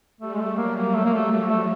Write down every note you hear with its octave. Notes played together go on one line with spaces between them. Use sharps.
G3 A3
G#3
A3
F#3 A#3
A#3
F#3 A3
A#3
A3
F3 A3
A3